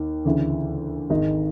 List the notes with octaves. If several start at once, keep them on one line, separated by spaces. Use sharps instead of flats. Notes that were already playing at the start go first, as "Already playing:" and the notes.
Already playing: D#2 D#3
D2 C#3 E3
G#1 G#2 D#3 D#4